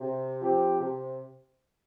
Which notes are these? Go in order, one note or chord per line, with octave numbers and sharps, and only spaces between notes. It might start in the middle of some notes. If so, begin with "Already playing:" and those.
C3
F3 C4 G4
C3